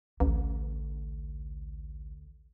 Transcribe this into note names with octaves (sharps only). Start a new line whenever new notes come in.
A1 D2